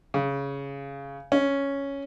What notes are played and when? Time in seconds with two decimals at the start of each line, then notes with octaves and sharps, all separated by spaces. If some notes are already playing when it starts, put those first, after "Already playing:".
0.14 C#3
1.32 C#4